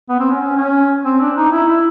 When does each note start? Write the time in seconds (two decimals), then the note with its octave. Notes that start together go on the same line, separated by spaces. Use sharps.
0.09 B3
0.20 C4
0.30 C#4
0.41 C#4
0.57 C#4
1.05 C4
1.20 D4
1.37 D#4
1.52 E4
1.68 E4